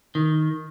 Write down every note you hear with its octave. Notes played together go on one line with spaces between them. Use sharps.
D#3